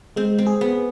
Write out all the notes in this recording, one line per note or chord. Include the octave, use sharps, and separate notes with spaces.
G#3 C4
C4
G#4
B3